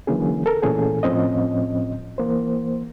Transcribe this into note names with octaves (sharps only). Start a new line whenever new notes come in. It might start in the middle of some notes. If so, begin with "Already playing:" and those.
D3 E3 F#3 A#3 C#4 G#4
A4 A#4
A#2 E3 A3 C#4 G#4 A4
A2 F3 C4 C#4 D#5
E3 A#3 C5